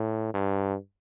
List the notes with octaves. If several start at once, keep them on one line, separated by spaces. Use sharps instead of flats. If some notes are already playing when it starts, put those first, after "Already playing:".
Already playing: A2
G2